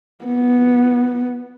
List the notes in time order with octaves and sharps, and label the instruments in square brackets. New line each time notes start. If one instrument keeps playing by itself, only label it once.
[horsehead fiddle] B3